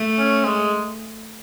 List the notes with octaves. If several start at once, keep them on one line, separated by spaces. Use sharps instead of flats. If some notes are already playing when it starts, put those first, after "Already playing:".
Already playing: A3
C#4
G#3